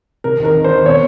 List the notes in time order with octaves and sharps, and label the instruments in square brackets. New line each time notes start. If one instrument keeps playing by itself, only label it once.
[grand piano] C3 A#4
D#3 A#4
D#3
C5
D#3
B2 C#5